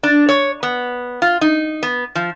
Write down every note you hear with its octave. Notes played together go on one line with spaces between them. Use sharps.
D4
C#5
B3
F4
D#4
B3
F3